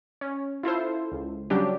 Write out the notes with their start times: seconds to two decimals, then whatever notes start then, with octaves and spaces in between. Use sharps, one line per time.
0.21 C#4
0.63 E4 F4 A4 C5
1.12 C#2
1.50 C#3 F#3 G3 C#4 D4 G4